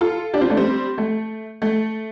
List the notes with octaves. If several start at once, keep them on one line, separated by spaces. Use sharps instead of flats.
F4 A4
D4 G4
C4 F4
A3 D4
G3 C4
A3
A3